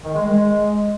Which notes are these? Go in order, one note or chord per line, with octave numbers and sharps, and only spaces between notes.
D#3
G#3
G#3